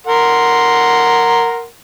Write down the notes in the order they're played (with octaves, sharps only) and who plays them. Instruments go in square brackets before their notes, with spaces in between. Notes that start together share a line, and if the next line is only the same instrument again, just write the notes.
[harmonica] A#4 F#5 C6